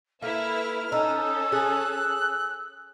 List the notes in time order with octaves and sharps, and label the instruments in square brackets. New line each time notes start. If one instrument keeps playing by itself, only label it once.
[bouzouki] A#3 [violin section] E4 B4 E5 [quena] A4 [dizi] F6
[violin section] C#4 A4 [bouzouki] D#4 [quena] E6
[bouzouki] G#4 [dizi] F#6